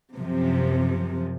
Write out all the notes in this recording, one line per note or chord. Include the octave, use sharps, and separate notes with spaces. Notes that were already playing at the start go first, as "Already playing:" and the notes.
F#2 C3 F3